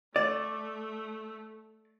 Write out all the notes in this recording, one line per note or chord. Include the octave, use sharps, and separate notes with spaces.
A3 D5